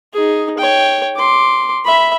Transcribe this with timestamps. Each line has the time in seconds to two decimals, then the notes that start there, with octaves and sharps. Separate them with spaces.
0.13 D#4 G#4
0.58 C#5 G5
1.16 C6 D6
1.85 E5 B5